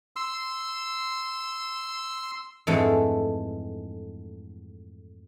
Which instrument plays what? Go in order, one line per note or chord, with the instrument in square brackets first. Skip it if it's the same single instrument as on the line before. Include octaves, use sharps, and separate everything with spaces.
[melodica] C6 E6
[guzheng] F2 G#2 D3 E3 G#3 A3